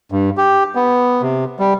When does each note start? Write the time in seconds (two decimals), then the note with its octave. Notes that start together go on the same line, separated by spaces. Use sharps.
0.12 G2
0.37 G4
0.75 B3
1.22 C3
1.59 G3